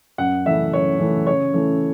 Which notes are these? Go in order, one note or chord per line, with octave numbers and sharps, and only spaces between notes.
F#2 F#5
E3 A3 E5
F#2 C#5
E3 A3
C#3 C#5
E3 A3